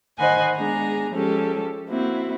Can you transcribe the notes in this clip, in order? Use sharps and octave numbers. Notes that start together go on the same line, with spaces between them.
D#3 C5 D#5 F#5 G#5 B5
G#3 B3 D4 G#4 A#5
F3 G#3 C#4 G4 A4
A#3 C4 E4 F#4